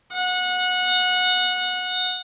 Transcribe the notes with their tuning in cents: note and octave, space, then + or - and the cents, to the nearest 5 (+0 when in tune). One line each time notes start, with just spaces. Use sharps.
F#5 -20